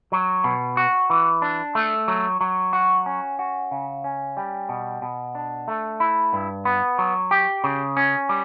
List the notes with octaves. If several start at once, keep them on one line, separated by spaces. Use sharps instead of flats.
F#3
B2
F#4
E3
D4
A3
F#3
F#3
F#4
C#4
F#4
C#3
C#4
G3
B2
B2
D4
A3
E4
G2
B3
F#3
G4
C#3
C#4
G3